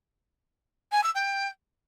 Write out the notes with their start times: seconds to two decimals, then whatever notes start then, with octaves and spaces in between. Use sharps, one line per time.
0.92 G#5
1.03 E6
1.15 G5